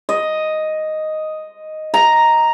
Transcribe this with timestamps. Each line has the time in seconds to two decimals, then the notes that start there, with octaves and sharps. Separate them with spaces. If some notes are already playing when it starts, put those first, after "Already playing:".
0.09 D#5
1.94 A#5